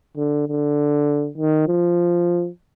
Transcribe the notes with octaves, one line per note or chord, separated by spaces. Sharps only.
D3
D3
D#3
F3